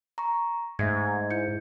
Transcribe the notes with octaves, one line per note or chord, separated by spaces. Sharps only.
A#5 C#6
G#2 A3 E5 G#6
E4 G6 C#7